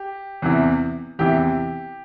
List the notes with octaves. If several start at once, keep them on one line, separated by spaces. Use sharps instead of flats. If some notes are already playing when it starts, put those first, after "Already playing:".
Already playing: G4
E2 C3 E3
E2 C3 E3 G4